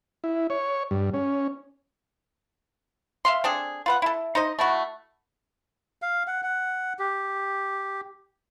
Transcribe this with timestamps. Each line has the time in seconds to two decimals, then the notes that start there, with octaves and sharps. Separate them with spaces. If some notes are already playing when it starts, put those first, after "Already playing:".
0.24 E4
0.50 C#5
0.91 G2
1.14 C#4
3.25 E5 F5 C6
3.44 C4 D4 G#4 A4
3.86 F4 B4 F#5
4.02 E4 A4
4.35 D#4 C5 D#5
4.59 A3 E4 F#4
6.02 F5
6.27 F#5
6.43 F#5
6.99 G4